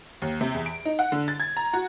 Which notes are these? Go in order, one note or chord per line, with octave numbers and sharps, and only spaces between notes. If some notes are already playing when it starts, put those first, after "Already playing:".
D#2
C3
E2
D7
D#4
F#5
D3
A6
G#6
A#5
F#4